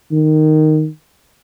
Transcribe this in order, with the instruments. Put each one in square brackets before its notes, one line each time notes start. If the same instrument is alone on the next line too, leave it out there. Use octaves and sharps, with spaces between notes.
[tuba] D#3